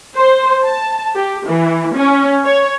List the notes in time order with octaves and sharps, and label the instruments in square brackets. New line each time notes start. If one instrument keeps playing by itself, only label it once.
[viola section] C5
A5
G4
E3
C#4
C#5